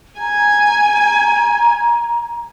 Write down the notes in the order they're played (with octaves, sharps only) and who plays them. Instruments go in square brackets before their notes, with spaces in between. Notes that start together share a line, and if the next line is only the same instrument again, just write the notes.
[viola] G#5 [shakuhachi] A#5